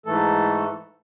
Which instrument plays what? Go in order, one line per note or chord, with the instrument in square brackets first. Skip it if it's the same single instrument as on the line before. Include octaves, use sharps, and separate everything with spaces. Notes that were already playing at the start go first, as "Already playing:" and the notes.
[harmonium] G#2 E3 A3 A4